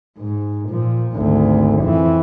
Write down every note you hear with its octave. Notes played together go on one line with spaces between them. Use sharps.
G#2
A#2 F3
G#1 D2
F2 E3